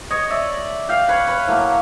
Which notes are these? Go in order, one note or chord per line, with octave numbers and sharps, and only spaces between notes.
C#5 D#5
D5 E5
F5 G5
B4 C#5
B4 C#5
A2 F#3 A#3